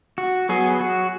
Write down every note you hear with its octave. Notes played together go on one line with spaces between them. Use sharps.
F#4
F#3 B3 G#4
F#4